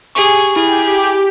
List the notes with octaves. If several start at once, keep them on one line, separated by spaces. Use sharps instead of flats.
G4 G#4 C#6
E4 G4 G#4